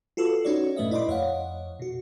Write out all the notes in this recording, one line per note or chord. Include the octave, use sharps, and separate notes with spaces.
F4 F#4 A4 B4 E6
C#4 D#4 F#4 C#5 D5
G2 A#2 A3 B4 D#5 E5
E4 D5 D#5 B5 C6 D6
F2 C#5 D#5 F5 F#5
B2 F#4